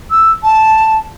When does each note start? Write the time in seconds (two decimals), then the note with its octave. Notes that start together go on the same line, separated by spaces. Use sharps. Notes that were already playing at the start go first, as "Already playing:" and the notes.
0.11 E6
0.43 A5